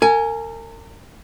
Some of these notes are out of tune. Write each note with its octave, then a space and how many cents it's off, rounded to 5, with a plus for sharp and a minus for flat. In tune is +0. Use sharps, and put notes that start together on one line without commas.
A#4 -40 G#5 +5